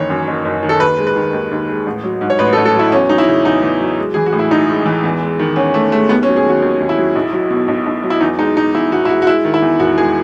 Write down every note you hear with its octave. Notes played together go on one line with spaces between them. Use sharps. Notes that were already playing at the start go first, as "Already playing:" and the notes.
Already playing: F#1 D#3 E3 C#5
F#2
F#1
F#1
D#3
A4
D#2 B4
G#3
B4
D#3
D#2
D#2
G#3
A1
F#3
G#2
C#5
A1 B4
A4
A1
A4
F#3
E4
E2 C#4
F#3 D#4
E4
C#3
E2 D#4
E2
F#3
G#3
E3 G#4
F#4
A2
E4
B1 D#4
G#3
E3
E2
G#3
D#3
E2 C#4
E2 A3
G#3 A3
D#2 B3
C#4
F#3
G#4
D#3 F#4
D#2
D#2
E4
F#3
B1
F#3
B2
B1
B1
F#3
E4
E2 D#4
G#3 D#4
B2 D#4
E2 E4
E2 F#4
E4
G#3 F#4
F#4
G#3 E4
D#3
E4
E2
E1 F#4
G#3 G#4